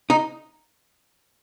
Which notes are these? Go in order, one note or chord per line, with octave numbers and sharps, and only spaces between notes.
D#4